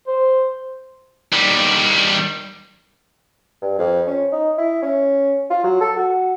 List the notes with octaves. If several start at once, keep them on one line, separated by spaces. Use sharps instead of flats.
C5
D#3 G3
G2
F2
C#4
D#4
E4
C#4
F4
F#3
A4
F#4